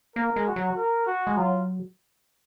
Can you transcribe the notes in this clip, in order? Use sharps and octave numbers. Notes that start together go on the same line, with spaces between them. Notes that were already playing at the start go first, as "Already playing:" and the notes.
A#3 A#4
G#3
F#4
F#3
A#4
F#4
G#3
F#3 F4